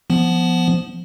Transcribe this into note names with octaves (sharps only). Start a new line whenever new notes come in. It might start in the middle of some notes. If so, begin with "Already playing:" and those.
F3 B3